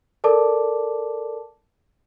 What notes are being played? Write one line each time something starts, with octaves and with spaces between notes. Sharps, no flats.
A4 A#4 D5 A5 D6